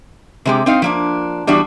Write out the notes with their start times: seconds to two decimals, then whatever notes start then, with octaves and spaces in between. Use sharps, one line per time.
0.45 C3 G#3 G4
0.66 C4 D#4 F5
0.82 F3 A#3 D4
1.47 E2 G3 D4 F#4